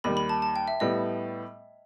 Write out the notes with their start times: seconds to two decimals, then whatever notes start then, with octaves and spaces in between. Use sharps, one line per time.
0.04 D#2 D#3 G3 B5
0.17 B5
0.29 A5
0.42 A5
0.56 G5
0.68 E5
0.80 A2 G3 B3 D#5